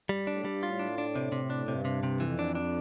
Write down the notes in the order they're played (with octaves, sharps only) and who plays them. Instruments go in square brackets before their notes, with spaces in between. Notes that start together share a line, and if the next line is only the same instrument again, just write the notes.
[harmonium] G2 [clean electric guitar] G3
[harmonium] G2
[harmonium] A2 [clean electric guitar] D4
[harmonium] G2 [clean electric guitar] G3
[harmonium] A2 [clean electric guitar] F4
[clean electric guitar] D4
D4
C3
C3
D4
[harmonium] G2 [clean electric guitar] C3
[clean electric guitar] C3
C3
[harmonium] F2 [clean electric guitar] E3
[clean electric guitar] D4
D4